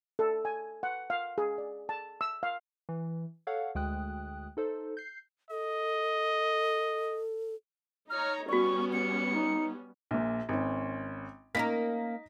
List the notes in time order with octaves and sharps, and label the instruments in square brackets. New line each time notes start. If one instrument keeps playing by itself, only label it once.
[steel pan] A4
G#5
F#5
F5
G#4
D5
A5
E6
F5
[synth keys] E3
A4 C#5 F5 F#5
D2 G#3 G5 D#6 F#6
D#4 A4 C5
G6 C7
[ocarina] A4 [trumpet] D#5
[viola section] D#4 C#5 A#5 [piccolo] F6
[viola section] G3 B3 C#4 [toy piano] F#4 D5 [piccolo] C#6
[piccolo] C#7
[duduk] D#4
[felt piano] A#1 A#2
G#1 C#4
[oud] A#3 C#4 A#4 [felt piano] D#4 A#6 B6